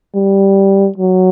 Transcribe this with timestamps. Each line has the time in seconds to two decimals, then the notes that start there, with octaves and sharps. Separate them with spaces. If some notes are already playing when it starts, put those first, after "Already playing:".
0.15 G3
0.98 F#3